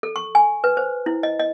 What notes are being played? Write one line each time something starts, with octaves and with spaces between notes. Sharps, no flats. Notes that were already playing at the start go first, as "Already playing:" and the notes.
A4
C#6
G#5
B4
C5
E4
D#5
D#5